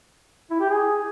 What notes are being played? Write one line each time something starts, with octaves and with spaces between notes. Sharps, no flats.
E4
G4
G#4